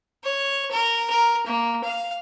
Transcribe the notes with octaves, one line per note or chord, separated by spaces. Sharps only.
C#5
A#4
A#4
A#3
F5